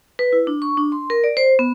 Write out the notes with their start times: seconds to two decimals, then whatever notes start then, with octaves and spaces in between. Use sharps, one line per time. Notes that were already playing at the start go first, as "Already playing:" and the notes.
0.19 B4
0.33 E4
0.47 D4
0.62 C#6
0.77 D4
0.92 C6
1.10 A#4
1.24 D5
1.37 C5
1.59 B3